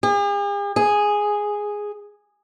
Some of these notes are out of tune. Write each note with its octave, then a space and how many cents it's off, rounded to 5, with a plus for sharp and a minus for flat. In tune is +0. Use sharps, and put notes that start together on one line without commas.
G#4 -45
G#4 -5